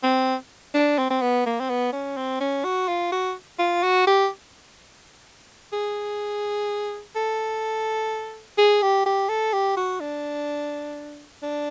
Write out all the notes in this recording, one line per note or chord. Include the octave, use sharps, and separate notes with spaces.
C4
D4
C4
C4
B3
A#3
C4
B3
C#4
C4
C#4
F#4
F4
F#4
F4
F#4
G4
G#4
A4
G#4
G4
G4
A4
G4
F#4
D4
D4